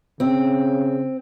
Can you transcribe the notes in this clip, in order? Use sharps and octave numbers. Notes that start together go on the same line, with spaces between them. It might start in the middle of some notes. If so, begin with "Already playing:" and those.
C#3 C4